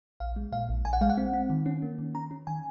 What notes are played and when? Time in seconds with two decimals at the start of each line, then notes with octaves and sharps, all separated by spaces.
0.20 A#1 F5
0.36 G#3
0.52 A#2 F5
0.69 A#1
0.85 A#1 G#5
0.93 F#5
1.01 G#3 F5
1.10 F#5
1.17 C4
1.33 C4
1.50 D#3
1.66 C#4
1.82 A#3
1.98 D#3
2.15 C#4 A#5
2.31 C#4
2.47 D#3 G#5